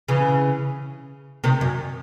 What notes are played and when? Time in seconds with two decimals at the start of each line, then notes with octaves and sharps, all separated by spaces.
0.08 C#3 E3
1.44 C3 D#3
1.61 F#2